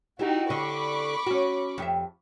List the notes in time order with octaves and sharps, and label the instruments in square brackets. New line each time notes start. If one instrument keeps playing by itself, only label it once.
[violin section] D#4 F#4 [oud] E4 G4
[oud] D3 D#5 [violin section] B5 C#6 D6
[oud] C#4 F#4
F2 G4 E5